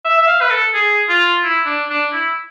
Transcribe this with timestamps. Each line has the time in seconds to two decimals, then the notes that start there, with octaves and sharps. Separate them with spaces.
0.05 E5
0.17 E5
0.28 F5
0.41 B4
0.51 A4
0.74 G#4
1.09 F4
1.43 E4
1.66 D4
1.90 D4
2.12 E4